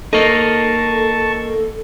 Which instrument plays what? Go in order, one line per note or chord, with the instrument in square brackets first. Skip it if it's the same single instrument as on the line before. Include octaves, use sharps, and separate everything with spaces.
[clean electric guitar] A#3 D#4 [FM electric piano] A4 [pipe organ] A5 C#6